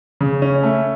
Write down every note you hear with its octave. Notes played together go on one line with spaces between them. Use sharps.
C#3
C#4
A3